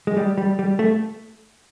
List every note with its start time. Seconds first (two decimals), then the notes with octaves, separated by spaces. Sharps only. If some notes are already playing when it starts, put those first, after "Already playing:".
0.07 G#3
0.17 G3
0.38 G3
0.59 G3
0.79 A3